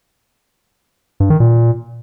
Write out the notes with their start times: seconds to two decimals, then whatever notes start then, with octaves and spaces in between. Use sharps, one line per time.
1.20 G2
1.30 D#3
1.40 A#2